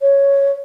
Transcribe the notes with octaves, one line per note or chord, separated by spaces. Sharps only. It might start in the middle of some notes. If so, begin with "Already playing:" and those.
C#5